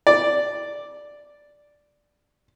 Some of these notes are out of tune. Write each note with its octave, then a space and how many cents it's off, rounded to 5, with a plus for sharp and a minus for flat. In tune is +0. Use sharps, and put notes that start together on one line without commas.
D5 +0